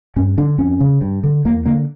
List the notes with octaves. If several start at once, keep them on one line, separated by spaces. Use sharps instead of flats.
G2 C#4
D3 D4
F2 C#4
C#3
G2
D3
E2 A#3
D3 A#3